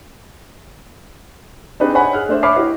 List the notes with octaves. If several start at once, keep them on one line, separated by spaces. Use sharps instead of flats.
C4 D4 D#4 G4 G#4 B4
C5 C#5 D#5 F#5 G#5 B5
G#4 F6 F#6
A3 D4 C5 E5
C#5 E5 B5 D6 F6 C7
E4 F#4 G4 B4 D#5